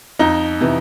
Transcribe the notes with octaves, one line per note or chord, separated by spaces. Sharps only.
F2 D#4
C3 E3